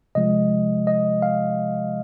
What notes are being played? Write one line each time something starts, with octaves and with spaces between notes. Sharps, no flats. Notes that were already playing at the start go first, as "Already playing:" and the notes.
C3 F3 G#3 D#5
D#5
F5